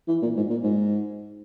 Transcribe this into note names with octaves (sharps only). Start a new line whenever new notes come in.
E3
A#2
G#2
A#2
G#2